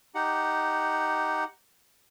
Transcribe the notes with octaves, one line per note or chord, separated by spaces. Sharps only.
D#4 G4 F#5